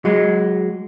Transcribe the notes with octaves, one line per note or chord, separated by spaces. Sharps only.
F#3 G#3